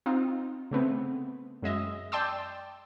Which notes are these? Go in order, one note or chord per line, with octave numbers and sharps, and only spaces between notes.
C4 D#4 F4
C#3 A3 B3 C4
F#2 G#3 D#5 E5
D5 G5 A5 C6 D6 E6